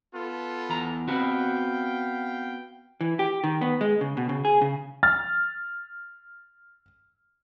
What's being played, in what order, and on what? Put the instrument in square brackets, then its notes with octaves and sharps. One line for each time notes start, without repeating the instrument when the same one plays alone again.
[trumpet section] B3 F4 A4
[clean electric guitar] E2 A#5
[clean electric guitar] B3 C4 F#4 [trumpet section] F5 G5
[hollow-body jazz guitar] E3
G4
D#3
B3
G#3
C#3
B2
C#3
G#4
C#3
[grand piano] F6 A6